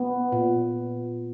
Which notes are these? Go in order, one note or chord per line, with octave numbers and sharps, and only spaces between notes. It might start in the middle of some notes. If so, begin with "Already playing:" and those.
Already playing: B3
A#2